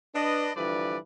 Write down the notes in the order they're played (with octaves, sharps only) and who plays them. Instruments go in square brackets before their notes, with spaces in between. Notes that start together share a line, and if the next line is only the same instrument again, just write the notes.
[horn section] D4 B4 D#5
G2 D3 E3 F3 B4 D5